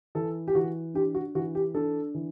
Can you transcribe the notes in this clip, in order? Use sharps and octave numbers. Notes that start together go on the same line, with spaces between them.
E3 A4
G4
E3 F#4
D4 G4
F#4
E3 F#4
G4
D4 A4
E3